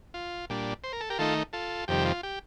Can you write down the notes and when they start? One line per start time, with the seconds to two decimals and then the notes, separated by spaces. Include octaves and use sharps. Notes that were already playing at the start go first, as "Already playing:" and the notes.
0.14 F4
0.50 A#2 G3 D4
0.84 C5
0.93 A#4
1.01 A4
1.10 G4 A#4
1.19 D#3 A3 D#4 F4 A4
1.53 F4 A4
1.88 F2 C3 D#3 G3 G4
2.06 F4
2.23 G4